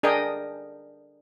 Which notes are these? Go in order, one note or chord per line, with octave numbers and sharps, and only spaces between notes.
D4 G#4 A#4 D#5 G5 G#5